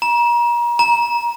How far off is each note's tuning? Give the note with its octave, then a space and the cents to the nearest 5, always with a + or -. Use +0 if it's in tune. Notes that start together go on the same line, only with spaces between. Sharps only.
A#5 +35
A#5 +20